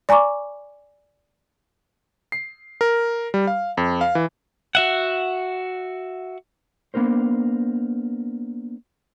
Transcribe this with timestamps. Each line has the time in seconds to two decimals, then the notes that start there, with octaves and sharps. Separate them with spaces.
0.09 D5 G#5 A#5 C#6 D6
2.32 C7
2.81 A#4
3.34 G3
3.47 F5
3.77 F2
4.01 F5
4.15 E3
4.75 F#4 E5 F#5
6.94 A#3 B3 D4 A#4 C5